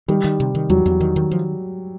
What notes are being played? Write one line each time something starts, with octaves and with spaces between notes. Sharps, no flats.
D#3 G3
D#3
C3
D#3
E2 F#3
E2
D#3
D#3
F3